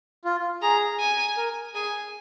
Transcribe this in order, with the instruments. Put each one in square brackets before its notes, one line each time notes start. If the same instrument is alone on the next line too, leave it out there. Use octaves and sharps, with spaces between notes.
[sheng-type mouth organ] F4
[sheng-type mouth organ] G#4 [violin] A#5
[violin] G#5
[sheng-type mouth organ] A#4
[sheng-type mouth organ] G#4 [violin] G#5